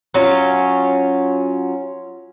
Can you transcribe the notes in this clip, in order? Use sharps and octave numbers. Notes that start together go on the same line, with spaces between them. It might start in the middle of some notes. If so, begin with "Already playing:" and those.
F#3 C#4 F4